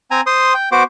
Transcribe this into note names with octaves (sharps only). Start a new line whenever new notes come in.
C4 G#5 A#5
C5 C6 D#6
G5
B3 F#4 C5 D6